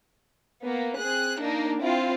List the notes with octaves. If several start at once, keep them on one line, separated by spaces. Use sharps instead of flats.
A#3 B3
C4 G#4 F#6
A#3 D4 D#4
C4 E4 F4